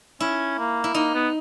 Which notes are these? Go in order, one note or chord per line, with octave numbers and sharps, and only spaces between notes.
C#4 E4
A#3
E4
A#3 D#4
B3